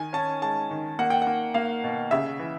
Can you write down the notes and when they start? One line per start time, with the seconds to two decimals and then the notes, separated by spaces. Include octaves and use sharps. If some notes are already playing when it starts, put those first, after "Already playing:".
Already playing: D#3 G#5
0.13 C#4 A5
0.42 G#3 A5
0.71 D#3
0.99 A#3 F#5
1.10 G5
1.22 F#5
1.27 A#3
1.54 A#3 F5
1.84 B2
2.11 C#3 E5
2.39 E3